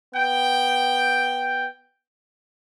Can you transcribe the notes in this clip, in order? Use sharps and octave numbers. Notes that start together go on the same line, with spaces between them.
B3 G5